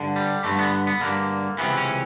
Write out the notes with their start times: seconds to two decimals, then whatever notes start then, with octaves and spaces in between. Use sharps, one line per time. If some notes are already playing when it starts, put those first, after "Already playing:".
Already playing: G2 D3
0.16 G3
0.44 G2 D3 A3
0.59 B3
0.87 B3
1.01 G2 D3 A#3
1.58 C#2 C3 E3 B3
1.77 C#4